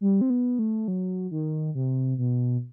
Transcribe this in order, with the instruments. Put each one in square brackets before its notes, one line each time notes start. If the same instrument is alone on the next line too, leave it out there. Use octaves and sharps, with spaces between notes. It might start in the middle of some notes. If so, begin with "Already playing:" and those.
[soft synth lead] G3
C4
B3
A3
F#3
D#3
C3
B2